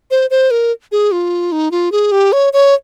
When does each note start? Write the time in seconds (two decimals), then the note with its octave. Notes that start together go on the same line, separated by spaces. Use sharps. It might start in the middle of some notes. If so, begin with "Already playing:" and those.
0.11 C5
0.30 C5
0.51 A#4
0.92 G#4
1.12 F4
1.52 D#4
1.71 F4
1.92 G#4
2.12 G4
2.32 C#5
2.53 C#5